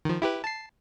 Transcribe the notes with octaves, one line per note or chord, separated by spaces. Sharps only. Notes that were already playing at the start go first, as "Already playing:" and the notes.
D#3 F3
E4 G4 B4
A5 C7